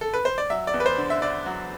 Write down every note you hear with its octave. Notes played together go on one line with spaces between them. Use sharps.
A4
B4
C5
D5
F#3 E5
D5
E2
B4
C5
D3
E5
D3 D5
F#3